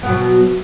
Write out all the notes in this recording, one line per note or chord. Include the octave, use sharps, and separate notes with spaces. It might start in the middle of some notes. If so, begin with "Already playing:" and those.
B2 F#3 B3